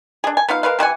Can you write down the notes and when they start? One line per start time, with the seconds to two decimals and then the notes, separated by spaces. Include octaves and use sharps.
0.24 D4 G#4
0.37 G#5
0.48 B3 D#4 F4 F5
0.63 G#3 A#4 B4 F5
0.79 C3 E3 F#5 G#5